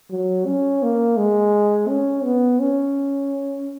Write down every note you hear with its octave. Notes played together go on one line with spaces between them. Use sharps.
F#3
C#4
A#3
G#3
C#4
B3
C#4